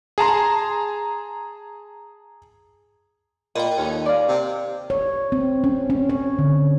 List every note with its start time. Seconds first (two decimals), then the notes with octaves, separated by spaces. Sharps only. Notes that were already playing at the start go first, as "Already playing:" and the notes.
0.18 G#4 A5 A#5 C6
3.55 A#2 D#5 G5 B5
3.78 D#2 D#4 A4 C#5
4.06 D5 F5
4.29 C3
4.90 C#5
5.32 C4
5.64 C#4
5.90 C#4
6.10 C#5
6.39 D3